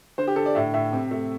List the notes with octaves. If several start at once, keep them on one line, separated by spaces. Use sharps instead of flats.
D3 C5
G4
D3 A4
D5
A2 E5
A2 E5
C3
A3